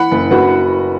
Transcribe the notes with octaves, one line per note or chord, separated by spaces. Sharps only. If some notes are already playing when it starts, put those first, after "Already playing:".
Already playing: E3 F#5 B5
F#1
F#1 F#4 B4